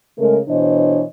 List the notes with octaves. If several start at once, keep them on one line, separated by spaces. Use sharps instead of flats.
C#3 G#3 A3 A#4
B2 E3 D4 C5 C#5 D#5